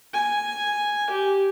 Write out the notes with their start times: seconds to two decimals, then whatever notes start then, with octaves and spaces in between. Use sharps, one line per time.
0.14 G#5
1.10 G4